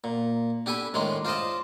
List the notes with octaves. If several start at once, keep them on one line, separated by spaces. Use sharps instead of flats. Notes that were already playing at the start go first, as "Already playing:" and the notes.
A#2
D4 G4 A4 G#5 B5
A2 D#3 G#3 D4 C6
F4 C5 D5 D#5 A5